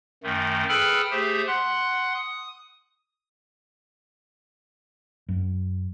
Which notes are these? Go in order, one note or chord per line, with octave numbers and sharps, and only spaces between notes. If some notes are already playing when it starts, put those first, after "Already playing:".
F#2 D#3 A3
G#4 A4 B4 G5 B5 F6
A3 G4 G#4 C5
F#5 C6 F#6
D#6
F#2